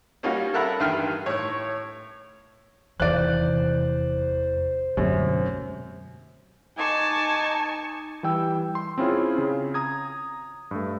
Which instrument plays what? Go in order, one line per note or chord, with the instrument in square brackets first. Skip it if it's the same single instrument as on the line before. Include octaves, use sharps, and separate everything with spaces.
[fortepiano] G3 A#3 C#4 D#4 F4 F#4
A4 A#4 E5 F#5 A#5 B5
A1 G2 D#3 G5 C6 F6
A2 C#5
[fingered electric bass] F1 E2 E3 [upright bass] C3 D#3 [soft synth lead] C5 [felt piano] D5 F#6
[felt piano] F#2 [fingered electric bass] B2 D3 A3 [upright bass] G#3 C4
[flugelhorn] D#4 [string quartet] G#5 A5 C#6 [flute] D6
[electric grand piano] E3 G3 G5 E6
C6
C4 C#4 E4 F4 G#4 C#5
C#3
A#5 D#6 G#6
G2 A3